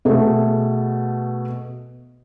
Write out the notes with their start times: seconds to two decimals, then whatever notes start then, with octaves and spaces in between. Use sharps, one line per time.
0.05 B2 A3 G#4